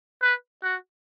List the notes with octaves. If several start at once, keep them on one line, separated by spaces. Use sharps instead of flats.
B4
F#4